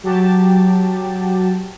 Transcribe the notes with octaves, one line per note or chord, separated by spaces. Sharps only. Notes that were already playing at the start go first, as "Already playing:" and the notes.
F#3 G4 A5